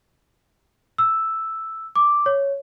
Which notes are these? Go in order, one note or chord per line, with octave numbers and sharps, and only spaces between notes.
E6
D6
C#5